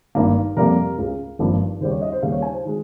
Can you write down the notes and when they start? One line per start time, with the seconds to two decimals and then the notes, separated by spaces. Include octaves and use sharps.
0.15 G#1 G2 D#3 A#3
0.57 F2 C3 G3 A#3 A#4
0.98 C#2 C#3 G#3
1.39 G#1 G2 F3 A#3
1.81 D#2 C#3 G3 C5
1.91 C#5
2.02 D#5
2.12 C5
2.22 D#2 C#3 G3 A#3 F5
2.32 C#5
2.42 G#5
2.53 C5
2.65 D#3 G#3